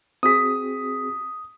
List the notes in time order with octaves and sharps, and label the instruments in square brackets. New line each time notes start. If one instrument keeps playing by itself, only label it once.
[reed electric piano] C4 F#4 G#4 [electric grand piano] D#6 B6